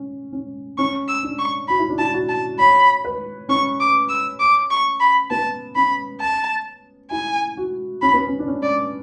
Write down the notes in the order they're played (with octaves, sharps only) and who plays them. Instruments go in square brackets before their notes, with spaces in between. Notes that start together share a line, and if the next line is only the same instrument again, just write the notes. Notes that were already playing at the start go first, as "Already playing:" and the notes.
Already playing: [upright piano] C#4
C#4
[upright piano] C#4 [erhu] C#6
[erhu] E6
[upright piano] D4
[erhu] C#6
[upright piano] F#4 [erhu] B5
[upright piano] E4
D4
[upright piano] E4 [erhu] A5
[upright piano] F#4
[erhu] A5
[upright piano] C#5 [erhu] B5
[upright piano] B4
[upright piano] C#4 [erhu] C#6
[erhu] D6
E6
D6
C#6
B5
[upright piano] B3 [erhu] A5
[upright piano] C#4 [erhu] B5
[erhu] A5
[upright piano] E4 [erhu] G#5
[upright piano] F#4
[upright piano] C#4 [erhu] B5
[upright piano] B3
C#4
D4
C#4
[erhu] D5